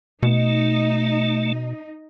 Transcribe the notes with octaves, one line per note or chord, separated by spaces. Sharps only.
B2 A3 D#4